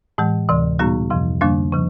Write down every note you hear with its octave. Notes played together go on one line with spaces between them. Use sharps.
A2 E3 G#3
D2 C3 E3
A#2 G3 B3 D#4 F#4
F2 C3 F3
F2 D3 G3 A#3 D4
C#3 F3